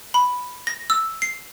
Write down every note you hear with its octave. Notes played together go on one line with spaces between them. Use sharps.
B5
A#6
E6
C7